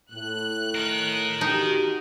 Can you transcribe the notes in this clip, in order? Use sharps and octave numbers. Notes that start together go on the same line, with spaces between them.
A2 F#6
A#4 D#5
D#4 F#4 G4